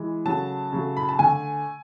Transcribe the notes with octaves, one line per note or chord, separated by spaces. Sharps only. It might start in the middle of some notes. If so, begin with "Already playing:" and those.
Already playing: E3 G#3
C#3 F#3 A3 A5
C#3 F#3 A3
B5
A5
D3 A3 G#5